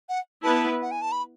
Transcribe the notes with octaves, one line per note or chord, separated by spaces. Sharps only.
F#5
B3 E4 B4 A5
F#5
G#5
A5
B5